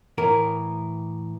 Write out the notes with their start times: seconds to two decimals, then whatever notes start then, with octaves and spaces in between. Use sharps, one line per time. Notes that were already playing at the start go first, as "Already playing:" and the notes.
0.18 A2 E3 A#4